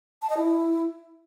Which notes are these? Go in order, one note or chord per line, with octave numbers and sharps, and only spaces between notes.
A5
D#5
E4